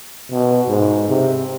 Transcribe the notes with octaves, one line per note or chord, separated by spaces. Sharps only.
B2
G#2
C3